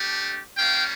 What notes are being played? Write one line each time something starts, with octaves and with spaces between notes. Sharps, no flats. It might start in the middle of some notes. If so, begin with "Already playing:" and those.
Already playing: A3 D4 G4
G3 A#3 C#4 F5 G5